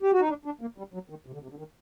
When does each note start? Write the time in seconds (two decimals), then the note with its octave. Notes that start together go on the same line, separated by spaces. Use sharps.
0.02 G4
0.12 F#4
0.20 D#4
0.29 D4
0.45 D4
0.61 A#3
0.78 G3
0.94 F#3
1.10 D#3
1.26 C3
1.34 D3
1.42 C3
1.50 D3
1.58 D#3